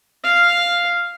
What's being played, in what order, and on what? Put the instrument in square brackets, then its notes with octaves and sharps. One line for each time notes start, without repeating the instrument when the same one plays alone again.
[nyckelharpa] F5